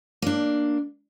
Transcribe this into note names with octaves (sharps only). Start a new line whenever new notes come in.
A#3 D4